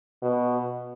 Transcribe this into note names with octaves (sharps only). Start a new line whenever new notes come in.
B2